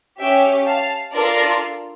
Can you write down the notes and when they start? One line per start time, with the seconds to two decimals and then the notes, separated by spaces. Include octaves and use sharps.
0.19 C#4 G4 E5 G5
0.66 F5 A5
1.13 D4 F4 A4 A#4 D5